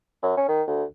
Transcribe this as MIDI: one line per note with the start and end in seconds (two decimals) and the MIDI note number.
0.23 0.35 42
0.37 0.44 61
0.48 0.62 51
0.68 0.83 38